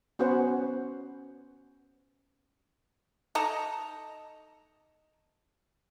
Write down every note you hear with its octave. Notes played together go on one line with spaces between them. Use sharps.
B3 C#4 F#4 B4 C5 F#5
D#4 A4 D#5 A#5